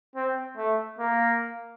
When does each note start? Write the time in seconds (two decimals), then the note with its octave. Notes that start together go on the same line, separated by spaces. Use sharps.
0.15 C4
0.57 A3
0.99 A#3